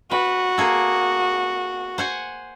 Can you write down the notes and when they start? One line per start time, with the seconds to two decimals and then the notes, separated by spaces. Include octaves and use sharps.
0.11 F#4 B4
0.58 A#3 G#4 A4
1.98 C5 F#5 G#5